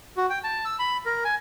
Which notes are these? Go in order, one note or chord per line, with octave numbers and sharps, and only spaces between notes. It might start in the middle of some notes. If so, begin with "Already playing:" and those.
F#4
G5
A5
E6
B5
A#4
G#5